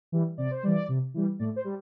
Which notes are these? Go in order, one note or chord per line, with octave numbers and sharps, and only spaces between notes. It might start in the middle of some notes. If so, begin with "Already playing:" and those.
E3 G3
C3 D5
C5
E3 G3 D5
C3
E3 G3
A2 D5
C5
G3